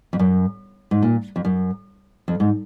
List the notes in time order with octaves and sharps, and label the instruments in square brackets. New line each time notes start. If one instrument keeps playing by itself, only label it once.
[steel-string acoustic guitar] F2
F#2
G#2
A#2
F2
F#2
F2
G#2